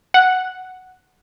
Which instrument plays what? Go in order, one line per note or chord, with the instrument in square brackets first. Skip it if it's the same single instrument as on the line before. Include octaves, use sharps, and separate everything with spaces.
[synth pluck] F#5